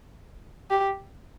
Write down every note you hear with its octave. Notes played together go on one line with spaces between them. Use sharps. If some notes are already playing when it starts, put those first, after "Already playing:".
G4